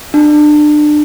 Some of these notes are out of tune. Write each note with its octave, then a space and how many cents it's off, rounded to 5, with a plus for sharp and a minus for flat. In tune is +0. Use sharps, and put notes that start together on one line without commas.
D4 +30